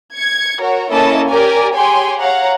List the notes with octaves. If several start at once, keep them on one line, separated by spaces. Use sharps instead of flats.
G#6 C#7
F#4 A#4 C#5
A#3 C#4 E4 A4 D#5 A5
G4 A#4 D5 G#5
G4 G#4 C#5 G5 G#5 C6
C#5 F5 F#5 A#5